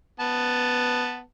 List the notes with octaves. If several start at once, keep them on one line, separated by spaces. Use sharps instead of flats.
B3 A5